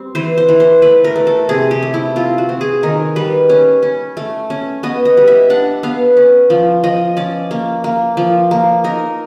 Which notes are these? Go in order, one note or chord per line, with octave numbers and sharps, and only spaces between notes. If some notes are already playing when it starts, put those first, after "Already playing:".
Already playing: G3 C4
E3 C5
C5
E3
C5
A3 B4
A#4
A3
A4
C3 G#4
G4
A3
E4
C4 F4
F#4
C4
G#4
D#3 A#4
G3 B4
C#4
C#4
A3
C#4
B3 D#5
D#5
G3
E5
D4 F#5
B3 F5
C#4
F3
F3 D#5
C#4 D5
A#3
A#3
F3
A#3
D#4 A#4